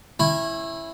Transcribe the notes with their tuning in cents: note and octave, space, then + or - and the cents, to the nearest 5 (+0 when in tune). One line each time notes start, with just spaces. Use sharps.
C#4 -30 E4 +0